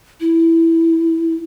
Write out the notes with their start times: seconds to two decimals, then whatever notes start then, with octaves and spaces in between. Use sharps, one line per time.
0.20 E4